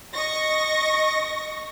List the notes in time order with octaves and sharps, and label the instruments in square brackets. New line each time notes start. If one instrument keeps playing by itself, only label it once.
[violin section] D#5 C#6 A#6